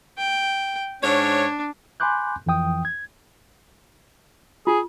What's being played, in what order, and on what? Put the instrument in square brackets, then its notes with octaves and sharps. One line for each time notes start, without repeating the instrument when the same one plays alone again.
[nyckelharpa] G5
[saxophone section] G#2 C#4 C#5 [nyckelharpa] D4
[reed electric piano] G#5 B5 C6 D6 F#6 G6
F2 E3 F3 G5 D#6
G#6
[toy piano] F4 [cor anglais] G#4